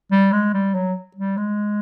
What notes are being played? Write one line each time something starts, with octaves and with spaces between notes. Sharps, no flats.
G3
G#3
G3
F#3
G3
G#3